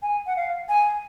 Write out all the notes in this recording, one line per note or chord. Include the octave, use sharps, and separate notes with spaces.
G#5
F#5
F5
G#5